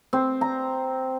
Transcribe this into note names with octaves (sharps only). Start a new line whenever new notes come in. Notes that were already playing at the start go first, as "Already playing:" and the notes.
C4
A#5